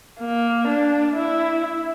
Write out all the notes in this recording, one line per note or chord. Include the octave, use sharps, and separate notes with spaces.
A#3
D4
E4